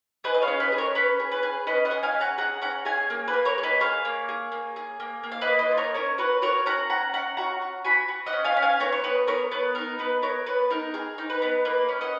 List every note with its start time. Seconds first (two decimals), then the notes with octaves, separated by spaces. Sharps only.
0.24 G#4 B4 D#5
0.35 D#5
0.42 C#5 F5
0.48 C#4
0.60 B4 D#5
0.72 G#4
0.78 A#4 C#5
0.95 C#4 B4
1.20 G#4
1.32 B4
1.43 G#4
1.67 C#4 B4 D#5
1.85 D#5 F#5
1.91 G#4
2.03 F5 G#5
2.14 C#4
2.20 F#5 A#5
2.38 G#4 F#5 A#5
2.62 C#4 F#5 A#5
2.85 G#4 F5 G#5
3.10 A#3
3.28 B4
3.33 A#3
3.45 A#4 C#5
3.58 G#4
3.63 B4 D#5
3.80 G#4 C#5 F5
4.05 A#3
4.29 G#4
4.52 A#3
4.76 G#4
5.00 A#3
5.23 A#3
5.32 F5
5.41 B4 D#5
5.47 A#3
5.59 B4 D#5
5.71 F4
5.77 A#4 C#5
5.94 C#4 A#4 C#5
6.18 F#4 B4
6.42 F#4 A#4 C#5
6.66 C#4 F#5 A#5
6.90 C#4 F#5 A#5
7.13 C#4 F#5 A#5
7.37 F#4 F#5 A#5
7.62 F#4
7.84 F#4 G#5 B5
8.08 F#4
8.26 D#5 F#5
8.33 C#4
8.44 F5 G#5
8.57 C#4
8.62 F5 G#5
8.80 B3 A#4 C#5
8.92 C#5
9.04 B3 B4
9.27 B3 A#4 C#5
9.51 B3 B4
9.75 D#4 A#4
9.99 B3 B4
10.22 B3 A#4 C#5
10.46 B3 B4
10.71 D#4 A#4
10.94 G#4 A#4
11.18 D#4
11.30 B4
11.42 B3
11.65 A#3 B4
11.89 C#4
12.01 D#5 F#5